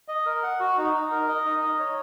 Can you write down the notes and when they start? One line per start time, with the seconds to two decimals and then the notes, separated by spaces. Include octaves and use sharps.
0.08 D#5
0.26 A#4
0.43 F#5
0.60 F#4
0.77 D#4
0.94 D#4
1.11 A#4
1.29 D#5
1.45 D#4
1.62 D#5
1.79 C#5